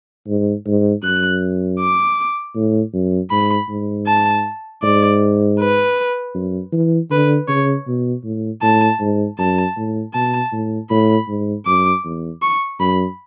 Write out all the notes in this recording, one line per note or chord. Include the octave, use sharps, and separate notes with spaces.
G#2
G#2
F#2 F#6
D6
A2
F#2
G#2 B5
G#2
A5
G#2 D5
B4
F#2
E3
D3 B4
C#3 C#5
B2
A2
A2 A5
G#2
F#2 A5
A2
B2 A5
A2
A2 B5
G#2
F#2 D6
E2
C#6
F#2 B5